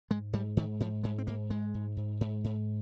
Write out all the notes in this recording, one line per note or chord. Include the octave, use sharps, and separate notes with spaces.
G#2 G#3
G#2 G3
G#2 D#3
G#2 F3
G#2 G#3
C4
G#2 A#3
G#2 G#3
G#2
G#2
G#2
G#2